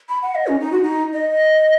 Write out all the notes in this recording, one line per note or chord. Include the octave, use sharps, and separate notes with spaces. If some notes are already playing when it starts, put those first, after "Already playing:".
B5
F#5
D#5
C#4
D#4
F#4
D#4
D#5